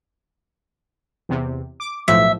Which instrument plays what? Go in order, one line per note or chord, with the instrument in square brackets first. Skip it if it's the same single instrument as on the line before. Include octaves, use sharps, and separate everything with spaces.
[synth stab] E2 C3
D6
[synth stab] B1 A2 F3 [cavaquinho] E5